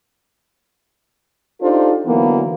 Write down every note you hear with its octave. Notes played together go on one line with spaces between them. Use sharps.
D4 D#4 F4 G4 A4 C5
D3 E3 F#3 A#3 B3